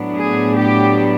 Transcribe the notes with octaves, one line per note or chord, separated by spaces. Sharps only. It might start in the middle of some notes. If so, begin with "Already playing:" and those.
Already playing: A2 F#3 B3 D4
G#4
G4